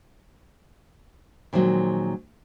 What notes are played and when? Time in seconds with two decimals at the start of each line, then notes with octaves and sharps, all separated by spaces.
1.53 A#2 D#3 F3 F#3 G#3